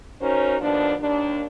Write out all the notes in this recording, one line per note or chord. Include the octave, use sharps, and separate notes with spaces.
C#4 D#4 F#4 A#4 C5 C#5
D#2 F3 B3 D4
D#2 D4